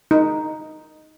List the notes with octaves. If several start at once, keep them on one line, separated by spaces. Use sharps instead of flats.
D#4